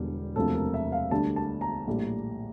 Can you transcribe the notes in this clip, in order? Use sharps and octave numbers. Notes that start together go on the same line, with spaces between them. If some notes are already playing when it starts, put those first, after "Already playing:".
Already playing: E1 E2 D3 G3
E1 D2 C3 F3 A4
A#4
E5
F5
D2 D3 G3 A5
A5
A#5
A#1 A2 G3